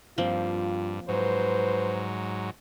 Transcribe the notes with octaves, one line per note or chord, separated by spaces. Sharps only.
G2 F3 A#3 C4 F4
G#2 F#3 B4 C5